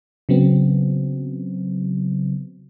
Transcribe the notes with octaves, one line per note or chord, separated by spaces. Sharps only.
C#3 F#3 B3 C4